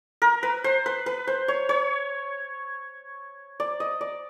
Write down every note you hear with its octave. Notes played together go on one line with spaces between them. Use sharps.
A#4
B4
C5
B4
B4
C5
C#5
C#5
D5
D#5
D5